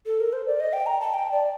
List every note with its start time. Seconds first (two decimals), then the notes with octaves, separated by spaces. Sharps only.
0.06 A4
0.20 A#4
0.33 C5
0.47 D5
0.60 D#5
0.73 G5
0.86 A#5
1.00 A5
1.14 G5
1.32 D5